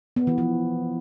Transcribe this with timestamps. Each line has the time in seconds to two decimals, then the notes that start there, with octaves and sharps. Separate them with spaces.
0.16 B3
0.27 E3
0.38 F3